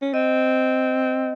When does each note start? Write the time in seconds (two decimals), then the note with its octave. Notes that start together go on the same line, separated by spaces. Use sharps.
0.02 C#4
0.13 C4 D#5